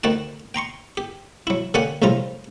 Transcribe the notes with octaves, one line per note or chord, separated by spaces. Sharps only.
D2 D#3 F#4 G5 A5
G5 A#5 C6 C#6
G4
F#3 E4
D3 A#3 C#4 G4 F#5 G#5
A#1 A2 C3 G3 F4 A#5